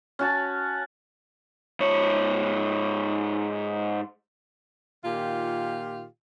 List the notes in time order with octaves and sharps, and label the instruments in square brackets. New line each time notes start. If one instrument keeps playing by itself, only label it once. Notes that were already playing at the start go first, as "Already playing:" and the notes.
[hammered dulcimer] C#4 F#4 A5
[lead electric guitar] G#2 C#5
[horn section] A#2 D#3 F4 G4